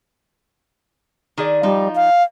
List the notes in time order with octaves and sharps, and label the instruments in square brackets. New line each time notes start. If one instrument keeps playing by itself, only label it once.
[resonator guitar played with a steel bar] D#3 G#4 D5
[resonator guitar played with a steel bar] F3 D#4 [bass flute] G3
[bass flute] F5